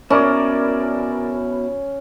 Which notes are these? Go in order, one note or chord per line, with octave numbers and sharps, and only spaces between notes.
B2 C#4 E4 A#4 D5 D6